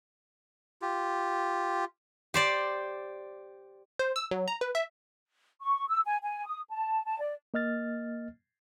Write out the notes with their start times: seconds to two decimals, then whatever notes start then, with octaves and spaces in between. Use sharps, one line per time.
0.82 F4 G4
2.34 G4 C5 D5
3.99 C5
4.16 E6
4.31 F#3
4.48 A#5
4.61 B4
4.75 E5
5.61 C#6
5.88 E6
6.05 G#5
6.22 G#5
6.46 D#6
6.70 A5
7.05 A5
7.20 D5
7.54 A#3 D#5 F6 A6